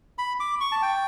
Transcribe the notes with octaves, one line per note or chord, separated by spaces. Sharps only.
B5
D6
C#6
A5
G5